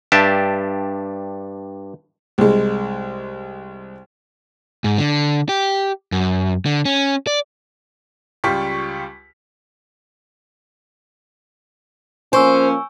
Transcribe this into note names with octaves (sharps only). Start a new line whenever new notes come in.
G2 D4 G4 E5 A5
C2 G#3
G#2
D3
G4
F#2
D3
C#4
D5
C#2 G3 F4 G4 C#6 B6
F3 A#3 C#4 C5 G#5 C#6 E6